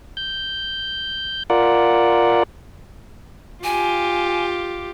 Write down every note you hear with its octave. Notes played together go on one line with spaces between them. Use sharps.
G6
F4 A#4 D5 F#5
F4 G4 G#5